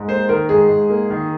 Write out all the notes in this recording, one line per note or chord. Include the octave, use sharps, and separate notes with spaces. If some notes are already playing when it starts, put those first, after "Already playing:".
Already playing: G#2
A#3 C5
D#3 A#4
G#2 G#4
G#2
A#3
D#3